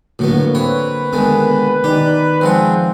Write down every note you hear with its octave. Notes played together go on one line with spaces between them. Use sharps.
A2 D3 F#3 A#3 B3 F#4
C4 B4 C#5
D3 D#3 G#3 B3
D#3 D#4 G4 D5
F3 G#3 C4 F#5